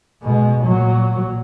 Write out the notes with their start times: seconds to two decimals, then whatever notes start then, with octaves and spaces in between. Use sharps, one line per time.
0.23 B2 G#3
0.64 A#2 F#3